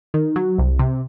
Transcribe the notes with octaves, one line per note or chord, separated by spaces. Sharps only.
D#3
F#3
C2
C3